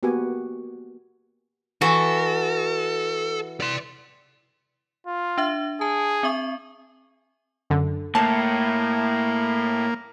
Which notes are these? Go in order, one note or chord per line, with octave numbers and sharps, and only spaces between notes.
A#3 B3 F#4 G4 G#5
E3 F#4 A4
D5 C6
F4
D4 E5
G#4 A5
C4 E5 C#6
F#2 D3
A2 A#3 A5